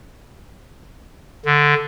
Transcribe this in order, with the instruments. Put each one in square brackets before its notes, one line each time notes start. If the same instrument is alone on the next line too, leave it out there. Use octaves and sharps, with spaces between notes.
[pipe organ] D3